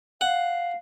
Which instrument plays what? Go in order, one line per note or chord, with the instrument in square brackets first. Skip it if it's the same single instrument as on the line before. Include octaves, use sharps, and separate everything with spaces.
[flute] F5 [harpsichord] F#5